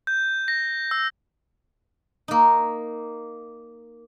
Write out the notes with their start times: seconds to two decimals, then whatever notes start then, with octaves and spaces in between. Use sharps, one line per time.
0.07 G6
0.48 A#6
0.91 E6
2.28 A#3 D#4